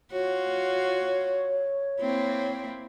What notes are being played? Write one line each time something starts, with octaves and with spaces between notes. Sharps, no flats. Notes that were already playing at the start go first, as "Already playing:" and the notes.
F4 F#4 C#5
A#3 C4 E4